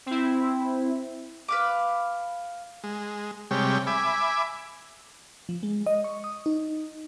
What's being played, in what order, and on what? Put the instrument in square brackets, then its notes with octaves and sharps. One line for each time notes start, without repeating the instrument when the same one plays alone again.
[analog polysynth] C4 E4
[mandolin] B4 F5 D6
[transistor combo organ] G#3
C3 G3 G#3 C#5 G5
E5 G#5 B5 D6
[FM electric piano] F3
G#3
D#5
C#6
D#6
D#4